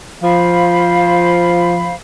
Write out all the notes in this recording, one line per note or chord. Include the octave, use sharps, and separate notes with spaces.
F3 C5 F5 B5